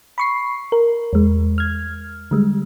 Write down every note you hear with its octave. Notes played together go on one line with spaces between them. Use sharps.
B5 C#6 C7
A#4
E2 G#3
F6 G#6
D3 G3 G#3